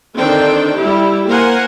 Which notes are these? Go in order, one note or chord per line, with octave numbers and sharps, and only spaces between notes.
D3 D#3 C4 D4 A4 G5
G3 E4 G4
A#3 A#4 C5 F#5 G#5